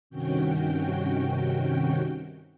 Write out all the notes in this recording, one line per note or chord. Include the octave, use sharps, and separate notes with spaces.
G2 C3 D#3 C#4 F#4 G5